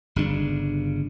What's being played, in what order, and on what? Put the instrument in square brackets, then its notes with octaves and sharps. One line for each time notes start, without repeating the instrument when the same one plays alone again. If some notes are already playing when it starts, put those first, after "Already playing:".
[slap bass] G1 C#3 C4 D4